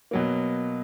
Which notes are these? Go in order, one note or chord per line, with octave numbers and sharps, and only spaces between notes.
B2 F#3 A#3